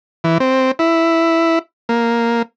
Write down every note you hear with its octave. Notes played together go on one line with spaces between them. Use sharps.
E3
C4
E4
A#3